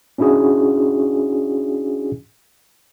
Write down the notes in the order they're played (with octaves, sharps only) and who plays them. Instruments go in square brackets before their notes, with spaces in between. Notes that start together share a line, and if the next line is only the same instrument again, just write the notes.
[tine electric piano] C#4 D4 E4 F#4 G#4